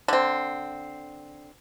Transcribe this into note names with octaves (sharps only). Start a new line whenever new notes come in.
D3 C4